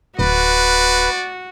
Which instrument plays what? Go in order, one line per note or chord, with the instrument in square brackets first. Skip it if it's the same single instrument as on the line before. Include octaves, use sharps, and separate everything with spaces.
[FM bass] D1 [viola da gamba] F#4 [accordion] B4 [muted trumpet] D5